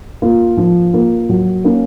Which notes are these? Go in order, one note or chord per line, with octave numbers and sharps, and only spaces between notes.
A#3 F4
F3
A#3 F4
F#3
A#3 C#4